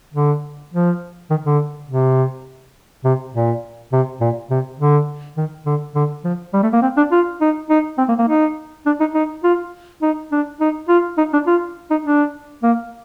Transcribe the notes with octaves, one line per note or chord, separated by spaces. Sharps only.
D3
F3
D#3
D3
C3
C3
A#2
C3
A#2
C3
D3
D#3
D3
D3
F3
G3
A3
A#3
C4
D4
F4
D#4
D#4
C4
A#3
A#3
D#4
D4
D#4
D#4
F4
D#4
D4
D#4
F4
D#4
D4
F4
D#4
D4
A#3